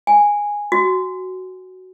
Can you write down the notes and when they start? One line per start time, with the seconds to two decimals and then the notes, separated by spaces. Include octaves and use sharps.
0.07 G#5
0.72 F#4